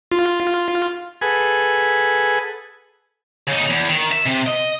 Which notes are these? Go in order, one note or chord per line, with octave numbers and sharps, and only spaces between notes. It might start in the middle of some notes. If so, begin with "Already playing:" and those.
F4
G#4 A4 B4 F#5 G#5
C#3 D#4
E2
D#3
E5
C3
D#5